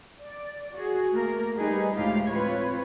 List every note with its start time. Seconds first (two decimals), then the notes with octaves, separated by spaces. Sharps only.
0.20 D5
0.74 F#4 G#4
1.12 A3 A#3 A#4
1.57 G3 D#4 G#4 B4
1.97 D2 A2 G#3 F4 G4 F5
2.27 C4 F4 B4 C#5